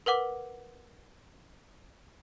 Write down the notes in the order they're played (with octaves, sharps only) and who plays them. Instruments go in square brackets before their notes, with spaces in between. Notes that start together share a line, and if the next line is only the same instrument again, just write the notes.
[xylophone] A#4 B4 F#5 D6